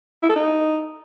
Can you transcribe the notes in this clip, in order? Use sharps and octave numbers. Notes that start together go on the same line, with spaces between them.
E4
A4
D#4